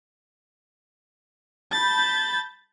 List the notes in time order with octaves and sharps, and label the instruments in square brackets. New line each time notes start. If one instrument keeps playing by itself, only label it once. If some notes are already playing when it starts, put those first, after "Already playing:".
[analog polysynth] A5 B5 G6 [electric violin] A6